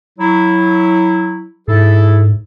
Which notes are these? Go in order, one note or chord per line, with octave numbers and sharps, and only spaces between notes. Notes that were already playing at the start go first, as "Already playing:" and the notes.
F#3 E4
G#2 E4 G#4 A4